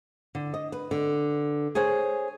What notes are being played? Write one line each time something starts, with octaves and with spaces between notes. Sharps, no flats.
D3
D#5
B4
D3
G#4 C5 C#5 G#5